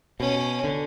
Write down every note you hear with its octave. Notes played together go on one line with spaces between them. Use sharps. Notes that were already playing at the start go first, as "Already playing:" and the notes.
B2 C#4
D3